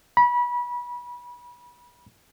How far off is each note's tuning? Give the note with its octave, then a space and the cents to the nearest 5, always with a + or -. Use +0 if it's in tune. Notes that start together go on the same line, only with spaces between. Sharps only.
B5 -25